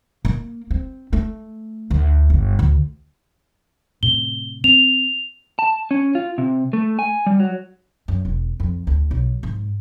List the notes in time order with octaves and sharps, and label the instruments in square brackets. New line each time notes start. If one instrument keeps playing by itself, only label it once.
[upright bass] A#3
C4
A3
D2
G1
D2
[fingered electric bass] A2 C3 [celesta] G7
[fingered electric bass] C4 [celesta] F7
[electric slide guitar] A5
C#4
F4
C3
A3
G#5
G3
F#3
[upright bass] F#2
E1
F2
D2
B1
G#2